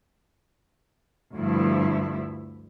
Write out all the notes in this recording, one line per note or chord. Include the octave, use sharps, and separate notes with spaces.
D2 G2 F3 E4